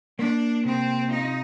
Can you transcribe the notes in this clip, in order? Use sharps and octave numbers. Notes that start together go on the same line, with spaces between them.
A#3 D4
C3 C4
D#4 F4